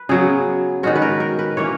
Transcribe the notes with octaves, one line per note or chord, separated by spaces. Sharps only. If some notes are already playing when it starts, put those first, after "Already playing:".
Already playing: B4
C#3 F#3 B3 G#4
D#3 G#3 C#4 F#4
B4
A#4
A#4
B4
E3 A#3 C#4 C#5